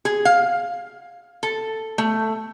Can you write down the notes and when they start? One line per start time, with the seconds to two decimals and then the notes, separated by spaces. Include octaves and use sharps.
0.05 G#4
0.25 F5
1.43 A4
1.98 A3